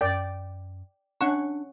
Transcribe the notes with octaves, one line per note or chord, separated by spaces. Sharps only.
F#2 D5 G5
C#4 D4 F#5 C#6